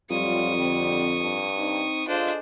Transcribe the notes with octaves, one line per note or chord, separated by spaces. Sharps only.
F2 F#3 G3 F4 C#6 D#6
D3 G3 C4
G2
C4 D#4
D4 F4 G#4 A4 C5 D#5